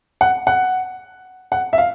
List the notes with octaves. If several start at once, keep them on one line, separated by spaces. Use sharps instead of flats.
F#5
F#5
F#5
E5
F5